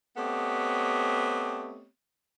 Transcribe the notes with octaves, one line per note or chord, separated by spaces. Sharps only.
A3 B3 C4 G4 C#5 D#5